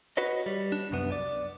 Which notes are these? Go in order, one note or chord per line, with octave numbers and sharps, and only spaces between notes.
F#4 B4 C#5 D#5
G3
D4
C2 F#2 B3
D5